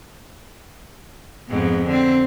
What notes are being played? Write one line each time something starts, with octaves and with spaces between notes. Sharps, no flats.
F2 G#2 B3
D3 C4